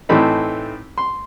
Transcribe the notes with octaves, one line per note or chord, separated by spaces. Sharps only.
A2 E3 A3 C4 D#4 B5
C6